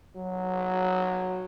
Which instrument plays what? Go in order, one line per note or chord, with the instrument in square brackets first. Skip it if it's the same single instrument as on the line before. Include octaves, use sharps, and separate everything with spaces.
[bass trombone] F#3